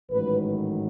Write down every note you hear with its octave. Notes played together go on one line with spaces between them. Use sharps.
A1 G#2 D#3 F#3 B4